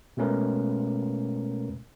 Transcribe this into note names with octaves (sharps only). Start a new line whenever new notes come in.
B2 G#3 A3 C#4 A#4 B4